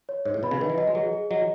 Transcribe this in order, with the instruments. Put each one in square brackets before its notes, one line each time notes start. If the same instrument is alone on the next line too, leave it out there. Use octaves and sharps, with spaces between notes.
[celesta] C#5
[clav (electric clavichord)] G#2 [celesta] C#5
[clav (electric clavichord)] A2
[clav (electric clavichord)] B2 [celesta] B5
[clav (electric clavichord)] C#3
[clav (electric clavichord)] D#3 [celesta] B4
[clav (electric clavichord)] E3
[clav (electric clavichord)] F#3 [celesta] D#5
[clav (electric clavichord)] G#3
[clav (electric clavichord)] F#3 [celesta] G#4
[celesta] G#4
[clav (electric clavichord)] F#3 [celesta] D#5